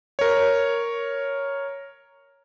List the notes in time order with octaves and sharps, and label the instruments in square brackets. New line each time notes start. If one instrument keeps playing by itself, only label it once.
[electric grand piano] A#4 C#5